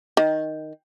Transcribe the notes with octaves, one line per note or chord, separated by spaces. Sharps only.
D#3